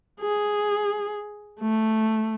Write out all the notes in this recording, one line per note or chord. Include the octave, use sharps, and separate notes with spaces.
G#4
A3